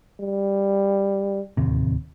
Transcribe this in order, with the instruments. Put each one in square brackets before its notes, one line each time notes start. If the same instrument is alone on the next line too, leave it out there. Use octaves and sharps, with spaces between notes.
[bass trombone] G3
[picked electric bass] D1 D#2 C3